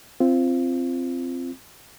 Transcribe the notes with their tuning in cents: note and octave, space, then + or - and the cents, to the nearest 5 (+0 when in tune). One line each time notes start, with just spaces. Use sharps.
C4 +0 F4 -20